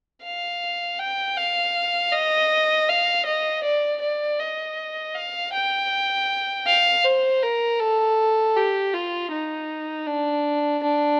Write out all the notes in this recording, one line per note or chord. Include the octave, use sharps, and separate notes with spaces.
F5
G5
F5
D#5
F5
D#5
D5
D5
D#5
F5
G5
F5
C5
A#4
A4
G4
F4
D#4
D4
D4